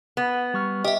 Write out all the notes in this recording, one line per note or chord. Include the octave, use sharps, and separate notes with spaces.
B3
G3 C#6 F6
G4 D#5 E5